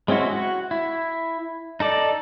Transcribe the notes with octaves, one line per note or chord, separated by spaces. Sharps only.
G#3 C4 C#4 E4 F#4
F#4
E4
D#4 A4 D5